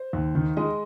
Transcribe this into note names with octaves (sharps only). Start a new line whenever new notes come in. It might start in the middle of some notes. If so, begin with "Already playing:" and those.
Already playing: C5
D#2
D#3
G#3 D#5